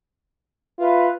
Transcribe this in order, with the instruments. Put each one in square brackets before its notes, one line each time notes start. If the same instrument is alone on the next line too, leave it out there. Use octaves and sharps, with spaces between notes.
[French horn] F4 [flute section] B4 E5